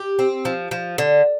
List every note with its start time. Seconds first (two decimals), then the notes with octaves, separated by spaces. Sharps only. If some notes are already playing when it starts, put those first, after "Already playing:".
Already playing: G4
0.19 C4
0.45 F3
0.71 F3
0.98 D3